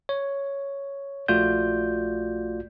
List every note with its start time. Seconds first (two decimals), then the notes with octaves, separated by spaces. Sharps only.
0.09 C#5
1.28 A#1 A3 F4 F#4 D5 G6